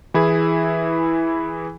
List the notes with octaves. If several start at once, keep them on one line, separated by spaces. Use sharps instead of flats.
E3 E4 G#4